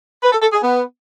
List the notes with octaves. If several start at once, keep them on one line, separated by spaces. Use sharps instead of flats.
B4
A4
A4
G#4
B3